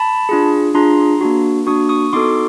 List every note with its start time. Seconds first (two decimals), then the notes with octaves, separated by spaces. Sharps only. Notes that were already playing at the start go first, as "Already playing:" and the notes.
Already playing: A5 B5
0.29 D4 F4 G#4
0.75 D4 F4 G#4 A#5 C6
1.21 A#3 D4 F#4
1.67 A#3 D4 F#4 C#6 D#6
1.89 C#6 D#6
2.13 B3 D#4 F#4 A4 C6 D6